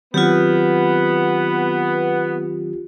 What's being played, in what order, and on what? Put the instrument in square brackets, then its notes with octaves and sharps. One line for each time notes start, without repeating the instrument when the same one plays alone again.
[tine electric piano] D#3 F#3 C4 [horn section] B3 [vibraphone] F4 G4